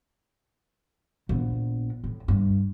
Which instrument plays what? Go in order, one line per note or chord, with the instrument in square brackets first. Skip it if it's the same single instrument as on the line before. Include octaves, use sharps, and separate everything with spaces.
[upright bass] A#1 B3
A2
G2